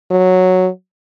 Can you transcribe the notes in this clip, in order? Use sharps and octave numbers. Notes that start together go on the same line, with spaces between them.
F#3